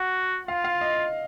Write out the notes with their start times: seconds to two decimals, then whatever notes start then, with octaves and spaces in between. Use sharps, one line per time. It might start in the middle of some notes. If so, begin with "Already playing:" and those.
Already playing: F#4 F#5
0.47 F4 F5
0.64 F5
0.81 D#5